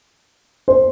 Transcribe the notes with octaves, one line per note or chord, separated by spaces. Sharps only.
C5